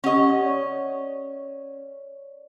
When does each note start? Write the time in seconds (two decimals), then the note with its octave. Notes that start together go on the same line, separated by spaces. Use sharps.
0.04 C#4 G4 D#5 F#5 C#6
0.43 C#5 D5